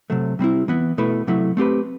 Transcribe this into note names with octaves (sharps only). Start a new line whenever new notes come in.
C3 F#3 A3
C3 G3 C4 E4
E3 B3 E4
B2 A3 E4 B4
C3 F#3 A3 E4
A3 C4 G4 B4